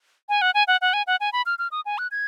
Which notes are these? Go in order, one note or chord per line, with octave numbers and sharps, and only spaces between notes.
G#5
F#5
G#5
F#5
F#5
G#5
F#5
G#5
B5
F6
F6
D#6
G#5
F#6
G#6